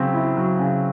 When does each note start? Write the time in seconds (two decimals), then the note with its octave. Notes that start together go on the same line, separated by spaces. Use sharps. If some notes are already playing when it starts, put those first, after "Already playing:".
Already playing: C#3 F#3 C4
0.13 E4
0.37 F#3
0.59 C#3